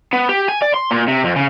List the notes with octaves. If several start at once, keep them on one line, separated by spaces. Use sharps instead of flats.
B3
G4
G#5
D5
C6
A#2
C3
F2
C#3